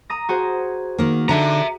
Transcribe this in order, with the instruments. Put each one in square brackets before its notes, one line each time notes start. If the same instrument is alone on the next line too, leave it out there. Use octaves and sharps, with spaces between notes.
[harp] A#5 D#6 A#6
F#4 G#4 C5
[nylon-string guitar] D#3 A#3
[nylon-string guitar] D3 D4 D#4 [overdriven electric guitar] E5 A#5